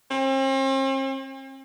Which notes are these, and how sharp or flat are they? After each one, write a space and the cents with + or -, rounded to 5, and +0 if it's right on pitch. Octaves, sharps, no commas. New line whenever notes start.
C4 +45